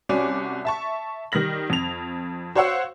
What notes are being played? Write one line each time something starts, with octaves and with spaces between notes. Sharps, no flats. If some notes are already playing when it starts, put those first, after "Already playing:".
C2 C#4 F#4 D5 D6
E5 A5 C#6
D#3 G3 F6 A#6 F#7
F2 F7
F#4 C5 C#5 F5 F#5 E6